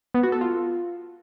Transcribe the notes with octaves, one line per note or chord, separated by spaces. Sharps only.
B3
F#4
A4
F4